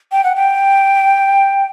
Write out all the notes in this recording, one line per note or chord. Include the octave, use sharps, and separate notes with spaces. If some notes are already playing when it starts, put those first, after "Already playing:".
G5
F#5
G5